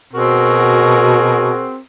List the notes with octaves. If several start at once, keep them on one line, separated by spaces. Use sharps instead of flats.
B2 C4 F#4 G#4 A#4